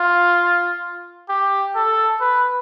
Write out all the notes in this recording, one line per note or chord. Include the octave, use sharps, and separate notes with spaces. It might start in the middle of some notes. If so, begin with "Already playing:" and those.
Already playing: F4
G4
A4
B4